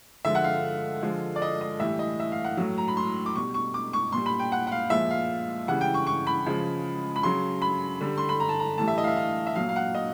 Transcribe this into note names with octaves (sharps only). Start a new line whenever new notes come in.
D3 F3 G#3 E5
F#5
F5
D3 F3 G#3
D5
D#5
D#5
A2 E3 G3 E5
D#5
E5
F5
F#5
A2 F#3
A#5
B5
C6
D6
B2 G3 C#6
C#6
D6
C#6
A#2 G3 C6
B5
G5
F#5
F#5
F5
A#2 F3 G#3 E5
F5
C#3 E3 G3 F#5
G5
C#6
C#6
B5
C#3 F3 G#3
B5
C#3 F#3 C6
B5
D3 G3
C6
B5
A#5
A5
A#5
A2 E3 G3 A5
E5
D#5
F5
E5
F5
E5
A#2 F#3 F5
F5
F#5
D#5